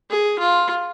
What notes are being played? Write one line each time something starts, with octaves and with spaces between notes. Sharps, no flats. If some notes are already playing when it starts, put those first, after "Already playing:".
G#4
F4